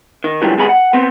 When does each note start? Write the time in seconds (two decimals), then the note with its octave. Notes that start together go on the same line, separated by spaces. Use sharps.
0.24 D#3
0.42 C#2 A#2 D3 E3 F#3 G3
0.57 D#2 C3 G#3 B3 G#4 B5
0.69 F#5
0.93 B3 C4